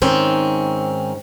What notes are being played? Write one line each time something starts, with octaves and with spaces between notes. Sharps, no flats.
G#2 D#3 C4 C#4